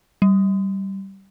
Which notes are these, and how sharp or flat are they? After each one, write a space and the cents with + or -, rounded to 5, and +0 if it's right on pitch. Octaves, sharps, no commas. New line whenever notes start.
G3 -15